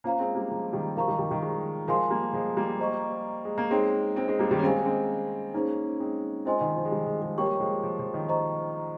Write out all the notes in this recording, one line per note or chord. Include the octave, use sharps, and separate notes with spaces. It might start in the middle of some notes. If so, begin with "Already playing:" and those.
A#3 C#4 F4 C5 F5 A#5
G#3 C4
G3 A#3
F3 G#3
D#3 G3
F3 A#4 F5 A#5 C#6
D#3 G3
D#3 G3
D#3 G3
F3 G#3
F3 G#3 A#4 F5 G#5 C6
G3 A#3
F3 G#3
G3 A#3
C5 D#5 A#5 C#6
G#3
A#3
G#3 C4 D#4 G#4 C#5 G5 C6
G#3 C4
G#3 C4
G3 A#3
D#3 G3
C#4
G#3 C4 C5 F5 G#5
G#3 C4
A#3 C#4 D#4 G#4 C5
G#3 C4
G#3 C4 F4 C5 D#5 G#5 C6
D#3
F3
G#3
D#3 G3
F3 G#3
F3 G#3
G3 A#3 G4 A#4 C#5 G5 C#6
F3 G#3
F3
F3
D#3
C5 D#5 A#5 C#6